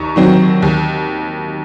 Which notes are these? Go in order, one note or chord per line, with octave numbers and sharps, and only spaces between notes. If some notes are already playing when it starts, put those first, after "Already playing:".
Already playing: D#2 D#3 A#5 C#6
D#3 F#3 C4
D#2